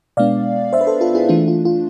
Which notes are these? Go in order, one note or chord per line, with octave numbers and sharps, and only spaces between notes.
B2 G#3 B3 D4 D5 F5
C5 E5
B4
A4 C5
F4 A4
E4 G#4
E3 A3 D4 F4
F4
F4